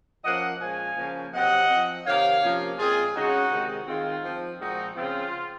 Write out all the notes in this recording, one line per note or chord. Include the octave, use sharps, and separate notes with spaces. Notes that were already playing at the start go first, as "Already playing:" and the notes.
F3 A#3 C#4 D#5 F#5
A#2 F3 G#3 C#4 F5 G#5
C#3 F3 A#3 C#4
C3 F#3 C4 D#5 F#5
F3 C4
C3 D#3 A#3 C#5 F5
C3 F3 A#3 C#4
A#2 G#3 C4 F4 G#4
C#3 G#3 C#4 D#4 F#4
C3 D#3 G#3 C4
D#3 G#3 C4 F4
F3 C4
A#2 F3 G#3 C4 D#4 F#4
C#3 F3 C4 F4